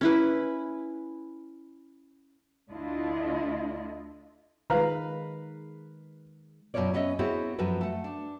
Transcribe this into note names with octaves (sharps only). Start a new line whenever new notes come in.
C#4 E4 B4
D2 D4 E4 F4 D#5
D#3 G#3 B4 F5 A#5
F#2 B2 A#3 F4 C#5 D5
B3 C#4 C#5 D#5 E5
B3 C4 E4 F#4 G#4 C#5
F#2 F3 F#4 A4 B4 G#5
A3 F#5
D4